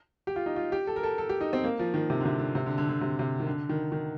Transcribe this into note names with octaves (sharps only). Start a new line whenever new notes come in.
G4
F4
D#4
F4
G4
A4
A#4
A4
A4
G4
D#4
C4
A#3
F3
D#3
C3
D3
C3
D3
C3
D3
D3
D3
C3
C3
D#3
D3
D#3
D#3